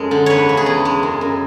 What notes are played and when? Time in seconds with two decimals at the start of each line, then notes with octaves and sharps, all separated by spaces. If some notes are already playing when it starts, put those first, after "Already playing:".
Already playing: F#2 G#3 A4
0.11 D3
0.26 E2 B4 C#5
0.49 C#3
0.57 G#4
0.66 E2
0.85 G#3
1.03 F#2
1.21 F#2